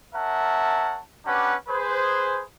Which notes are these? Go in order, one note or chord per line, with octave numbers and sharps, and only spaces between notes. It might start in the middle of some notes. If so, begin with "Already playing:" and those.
C#4 A#4 E5 F#5 A5
B3 C#4 D4 G4 B4 F#5
G#4 B4 C5